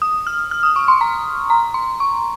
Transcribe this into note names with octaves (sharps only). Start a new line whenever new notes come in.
D#6
F6
F6
D#6
C#6
C6
A#5
A#5
C6
C#6